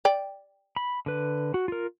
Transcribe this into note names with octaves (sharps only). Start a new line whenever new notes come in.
D5 G5
B5
D3 B4
F#4
F4 A#4